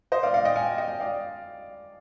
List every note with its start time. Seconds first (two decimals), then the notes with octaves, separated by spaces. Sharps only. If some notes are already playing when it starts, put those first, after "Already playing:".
0.12 C5 D#5
0.23 D5 F5
0.34 D5 F5
0.45 D#5 G5
0.56 F5 G#5
0.78 D#5 G5
1.00 D5 F5